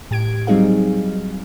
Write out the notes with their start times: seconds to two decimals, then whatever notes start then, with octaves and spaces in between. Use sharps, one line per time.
0.11 A2 G4 G#6 D7
0.47 F#3 G3 C4 D#4 G#4 F5